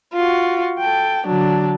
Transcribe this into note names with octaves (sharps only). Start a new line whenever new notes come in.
F4 F#4
A4 G5
D3 F#3 D4